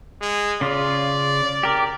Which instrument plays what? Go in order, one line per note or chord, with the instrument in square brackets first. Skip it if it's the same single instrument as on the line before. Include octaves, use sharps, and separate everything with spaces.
[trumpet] G#3
[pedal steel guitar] C#3 F4 [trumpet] D5
[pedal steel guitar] G4 A#4